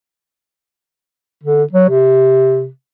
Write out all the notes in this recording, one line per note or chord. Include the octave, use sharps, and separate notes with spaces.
D3
F#3
C3